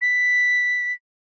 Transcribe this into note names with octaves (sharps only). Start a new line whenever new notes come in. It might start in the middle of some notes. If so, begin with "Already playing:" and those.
B6